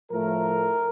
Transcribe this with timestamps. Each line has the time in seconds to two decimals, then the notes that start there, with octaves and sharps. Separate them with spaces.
0.11 A2 F3 A3 A#4